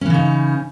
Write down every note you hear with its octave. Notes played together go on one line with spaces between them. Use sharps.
C#3 E3 C#4 D#4